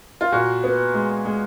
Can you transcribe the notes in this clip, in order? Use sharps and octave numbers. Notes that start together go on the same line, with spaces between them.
F4
A#2 F#4
B3
G#3
G#3